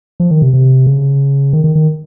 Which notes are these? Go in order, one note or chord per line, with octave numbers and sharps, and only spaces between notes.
F3
D#3
C3
C3
C#3
D#3
D#3
D#3